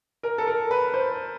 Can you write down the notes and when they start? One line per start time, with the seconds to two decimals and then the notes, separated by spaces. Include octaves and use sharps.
0.23 A#4
0.38 A4
0.47 A#4
0.71 B4
0.94 C5